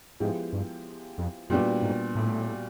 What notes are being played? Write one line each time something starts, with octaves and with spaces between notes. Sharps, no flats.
G#2 F3 G#3 B3 E4 G4
G2
F2
F#2 A#2 G3 B3 D4 F#4
G#2
A2